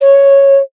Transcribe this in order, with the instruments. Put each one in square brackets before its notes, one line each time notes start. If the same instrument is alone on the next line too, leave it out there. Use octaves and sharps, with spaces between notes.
[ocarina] C#5